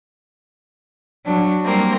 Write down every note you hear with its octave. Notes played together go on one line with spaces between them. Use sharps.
F#3 D4
G3 A#3 C4